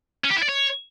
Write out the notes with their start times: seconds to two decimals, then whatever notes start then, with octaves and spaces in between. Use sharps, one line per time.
0.24 C#4
0.30 G4
0.36 E4
0.42 D5
0.49 C#5